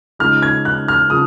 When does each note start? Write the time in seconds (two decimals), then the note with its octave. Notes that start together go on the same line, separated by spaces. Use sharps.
0.19 C#3 F3 G#3 D#4 F6
0.42 G#6
0.65 F#6
0.88 F6
1.10 C#3 F3 D#6